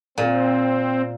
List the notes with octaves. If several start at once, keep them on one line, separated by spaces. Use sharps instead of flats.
A#2 C4